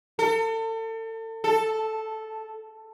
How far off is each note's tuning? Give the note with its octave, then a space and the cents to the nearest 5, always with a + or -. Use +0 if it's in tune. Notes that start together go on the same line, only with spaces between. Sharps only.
A4 +35
A4 -5